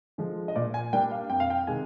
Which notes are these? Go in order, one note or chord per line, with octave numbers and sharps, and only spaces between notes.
D3 F3 G#3
D#5
A#2 D5
G#5
G3 A#3 D4 G5
F5
F2 G5
F5
G5
C3 D#3 G#3 G#5